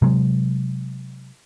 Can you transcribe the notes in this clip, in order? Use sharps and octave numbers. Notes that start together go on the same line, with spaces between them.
C3 F#3 G#3